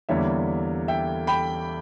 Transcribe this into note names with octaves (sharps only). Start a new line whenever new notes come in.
E2 D3 G3 A#3 C#5 E5
E5 G5
G5 B5